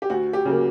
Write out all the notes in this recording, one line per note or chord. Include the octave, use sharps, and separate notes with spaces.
G4
D2 F#4
G4
C#3 F#3 A#3